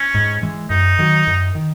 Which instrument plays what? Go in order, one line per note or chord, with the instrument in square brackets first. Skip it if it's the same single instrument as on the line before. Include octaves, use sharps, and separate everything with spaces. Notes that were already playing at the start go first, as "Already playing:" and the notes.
Already playing: [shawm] C#4
[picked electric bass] G#2
E3 G#3
[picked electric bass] F#2 [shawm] D#4
[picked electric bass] D#3 F#3
F#2
D#3